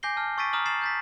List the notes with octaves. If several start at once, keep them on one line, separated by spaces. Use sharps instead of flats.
G#5 D6 G6 A#6 C7 G7
A5 F6
C#6 E6 A6 B6 D7 D#7
A#5 D#6 F6 F#7
A6 C7 E7 F#7
G6 A6 B6